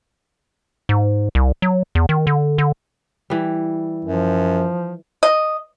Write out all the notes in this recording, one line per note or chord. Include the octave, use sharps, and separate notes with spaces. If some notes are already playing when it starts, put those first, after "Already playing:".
G#2
C2
F#3
E2
D#3
D3
D3
E3 G3
F#2 F3
D#5